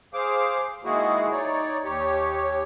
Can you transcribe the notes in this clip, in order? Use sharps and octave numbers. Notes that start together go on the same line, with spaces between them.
G#4 C5 F5 D6
D#3 G#3 A#3 E4 F#4 G#4
D#4 C#5 D5
D#2 G4 C#5